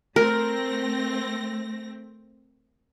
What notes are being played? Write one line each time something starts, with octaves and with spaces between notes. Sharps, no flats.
A3 C4 A#4 A#6